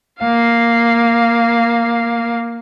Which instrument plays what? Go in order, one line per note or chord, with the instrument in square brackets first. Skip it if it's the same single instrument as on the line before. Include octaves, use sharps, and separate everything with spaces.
[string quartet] A#3 F5